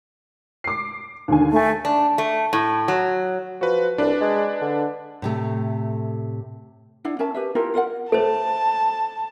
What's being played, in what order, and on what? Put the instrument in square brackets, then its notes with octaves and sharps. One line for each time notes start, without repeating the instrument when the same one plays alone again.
[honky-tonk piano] D6 C7
D#2 D3 G#5
[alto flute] A3 [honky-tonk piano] G#5 A5
[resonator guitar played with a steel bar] D4
A3
A2
F#3
[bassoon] F3 [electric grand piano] F#4 B4
[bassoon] C2 [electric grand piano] D4 B4 D5
[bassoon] G#3
D3
[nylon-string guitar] A2 C3 A3
[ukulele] D4 E4 F#5
C#4 A#4 E5 A5
G4 B4 E5
E4 F4 G4 A#4
F4 A#4 D#5 F#5
[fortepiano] A3 [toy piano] A4 C5 [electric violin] A5